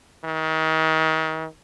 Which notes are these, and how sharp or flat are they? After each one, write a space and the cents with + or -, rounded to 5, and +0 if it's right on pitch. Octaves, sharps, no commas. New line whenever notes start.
D#3 +35